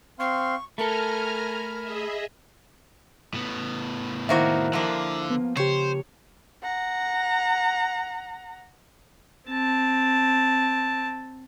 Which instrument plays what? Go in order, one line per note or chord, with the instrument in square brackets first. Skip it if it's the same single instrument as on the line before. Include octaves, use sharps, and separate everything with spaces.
[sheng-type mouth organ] C4 F5 C6 [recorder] C#6
[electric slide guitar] A3 A4 [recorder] A#4 [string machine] G#5 A#5 F6 [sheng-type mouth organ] B5
[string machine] G#4 D#5 E5
[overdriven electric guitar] A2 B3
[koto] D#3 A#3 F#4 [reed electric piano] E4 C5 E5
[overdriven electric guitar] D3 [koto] F3 A#3
[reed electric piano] B3
[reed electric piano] C#3 G4 [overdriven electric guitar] C5 [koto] C#5
[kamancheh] F#5 A#5
[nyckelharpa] C4 A5